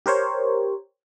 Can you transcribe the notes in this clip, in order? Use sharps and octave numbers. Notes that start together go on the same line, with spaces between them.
G4 A#4 C5 C#5